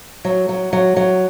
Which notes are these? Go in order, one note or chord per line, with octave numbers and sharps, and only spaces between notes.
F#3
F#3
F#3
F#3